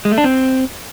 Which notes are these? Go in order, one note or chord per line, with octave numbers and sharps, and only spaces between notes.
G#3
A3
D4
C4